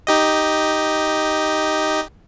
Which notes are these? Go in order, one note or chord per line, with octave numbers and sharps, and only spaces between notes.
D#4 G4 D#5